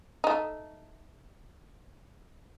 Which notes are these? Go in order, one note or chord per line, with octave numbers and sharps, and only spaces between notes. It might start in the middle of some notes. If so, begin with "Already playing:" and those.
A3 D#4